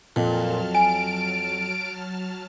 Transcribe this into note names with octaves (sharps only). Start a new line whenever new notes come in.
F2 A#2 F#3 A5 F6
G#5 D7